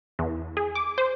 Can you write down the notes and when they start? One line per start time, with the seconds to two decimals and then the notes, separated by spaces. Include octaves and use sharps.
0.19 E2
0.57 G#4
0.75 D6
0.98 C5